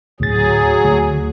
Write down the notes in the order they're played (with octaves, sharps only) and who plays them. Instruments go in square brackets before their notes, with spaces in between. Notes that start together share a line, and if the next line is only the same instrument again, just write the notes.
[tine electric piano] D2 A2 A6 [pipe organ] F#3 G#4
[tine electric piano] D2